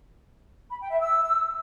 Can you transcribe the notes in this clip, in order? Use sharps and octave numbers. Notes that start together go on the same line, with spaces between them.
B5
G5
E5
E6